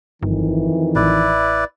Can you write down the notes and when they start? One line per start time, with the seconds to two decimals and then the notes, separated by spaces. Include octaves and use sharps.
0.23 G1 F2 D#3 E3
0.96 A1 E4 B4 D5